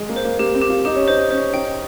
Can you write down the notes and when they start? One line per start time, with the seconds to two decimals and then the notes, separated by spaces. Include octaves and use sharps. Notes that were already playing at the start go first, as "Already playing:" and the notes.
Already playing: G#3
0.09 A#3
0.16 C5
0.25 A#3
0.39 A#3 G4
0.55 C4
0.62 G4
0.69 F4
0.85 D#4 G4
0.96 C#4
1.08 D#4 C5
1.30 C#4 C5
1.53 D#4 G5